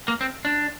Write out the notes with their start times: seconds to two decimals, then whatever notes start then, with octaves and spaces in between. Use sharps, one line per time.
0.08 A#3
0.21 C4
0.45 D4